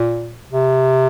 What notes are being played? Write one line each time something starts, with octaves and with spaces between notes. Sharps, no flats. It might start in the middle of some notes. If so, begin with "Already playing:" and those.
Already playing: A#2
C3